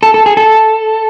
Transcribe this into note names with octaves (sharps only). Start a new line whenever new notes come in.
A4
A4
G#4
A4